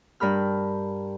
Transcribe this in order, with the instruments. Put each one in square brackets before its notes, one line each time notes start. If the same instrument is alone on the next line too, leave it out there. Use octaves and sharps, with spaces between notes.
[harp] G2 A#4 B5 F6